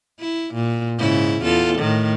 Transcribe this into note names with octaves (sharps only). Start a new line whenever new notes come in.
E4
A#2
G#2 C#3 E4
E2 F4 A4
A2 D#3